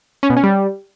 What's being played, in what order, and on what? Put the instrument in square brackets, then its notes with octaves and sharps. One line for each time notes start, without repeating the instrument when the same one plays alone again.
[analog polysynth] C#4
B2
C#4
G3